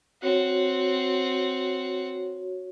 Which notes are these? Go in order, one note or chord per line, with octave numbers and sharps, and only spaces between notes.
C4 F#4 C#5 F#5